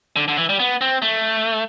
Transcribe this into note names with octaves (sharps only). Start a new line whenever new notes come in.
D3
D3
E3
G3
B3
C4
A3